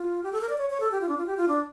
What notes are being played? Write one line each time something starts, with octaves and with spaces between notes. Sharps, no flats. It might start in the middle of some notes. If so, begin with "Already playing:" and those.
Already playing: F4
G4
A4
A#4
D5
C#5
C#5
A4
G4
F4
D4
F4
G4
F4
D4